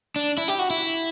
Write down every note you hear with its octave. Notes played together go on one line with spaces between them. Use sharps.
D4
E4
G4
F#4
E4